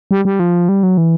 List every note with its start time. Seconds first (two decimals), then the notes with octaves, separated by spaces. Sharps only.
0.11 G3
0.25 G3
0.40 F3
0.69 G3
0.83 F#3
0.98 E3